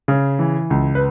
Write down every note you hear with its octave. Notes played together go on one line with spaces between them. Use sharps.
C#3
E3
C#2
B4